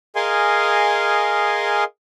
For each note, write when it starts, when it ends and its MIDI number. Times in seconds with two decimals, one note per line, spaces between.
0.16 1.84 68
0.16 1.84 70
0.16 1.84 75
0.16 1.84 77
0.16 1.84 80
0.16 1.84 84